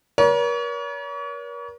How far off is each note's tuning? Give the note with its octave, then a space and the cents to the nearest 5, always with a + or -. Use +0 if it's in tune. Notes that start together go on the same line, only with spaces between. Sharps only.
A#4 +45 C#5 +40